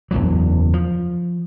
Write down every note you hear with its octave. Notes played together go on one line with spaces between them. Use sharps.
F#1 B1 E2 F#3
F3